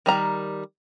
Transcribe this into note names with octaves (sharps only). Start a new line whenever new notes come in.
D#3 G3 A#5